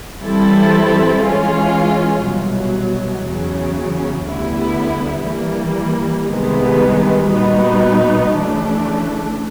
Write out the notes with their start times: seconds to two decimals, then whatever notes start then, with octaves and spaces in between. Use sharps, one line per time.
0.21 E3 G3 C4 E4 A4
1.22 E3 G#3 C#4 F4
2.24 C2 B2 F#3
3.25 E2 C#3 F#3
4.27 D2 D3 G3 B3 E4
5.28 E3 G3 A#3
6.30 C2 C3 D#3 G#3 B3
7.31 A#2 G3 B3 D#4 F#4
8.32 C#3 E3 A3 D4